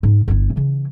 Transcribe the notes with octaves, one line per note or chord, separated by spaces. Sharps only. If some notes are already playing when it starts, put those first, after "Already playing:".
G#2
G1 E4
C#3 E3